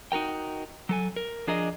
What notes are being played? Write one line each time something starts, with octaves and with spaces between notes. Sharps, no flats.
D#4 F#4 A#4 G5
F#3 A4 G#5
A#4
F3 D4 G#4 A#4 D5 D#5